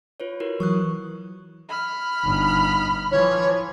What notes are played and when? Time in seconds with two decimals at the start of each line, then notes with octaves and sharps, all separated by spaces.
0.20 F4 B4 C#5
0.40 E4 F#4 A#4
0.60 E3 F#3 C#6 D#6 F#6
1.69 B5 F6
2.24 G1 D#4
3.11 E3 F3 C#5